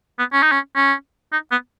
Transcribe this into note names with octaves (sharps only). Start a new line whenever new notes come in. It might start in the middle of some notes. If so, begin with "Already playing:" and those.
B3
C#4
D#4
C#4
C#4
D#4
B3